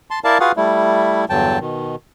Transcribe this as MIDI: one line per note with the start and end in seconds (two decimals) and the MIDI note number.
0.10 0.19 81
0.10 0.19 84
0.24 0.38 64
0.24 0.38 70
0.24 0.38 74
0.24 0.38 77
0.24 0.38 81
0.40 0.52 65
0.40 0.52 66
0.40 0.52 68
0.40 0.52 71
0.40 0.52 77
0.40 0.52 78
0.56 1.25 55
0.56 1.25 57
0.56 1.25 64
1.30 1.59 40
1.30 1.59 43
1.30 1.59 50
1.30 1.59 54
1.30 1.59 79
1.30 1.59 81
1.60 1.96 47
1.60 1.96 51